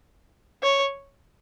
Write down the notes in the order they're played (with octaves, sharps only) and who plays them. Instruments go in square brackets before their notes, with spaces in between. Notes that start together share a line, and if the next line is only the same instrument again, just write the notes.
[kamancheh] C#5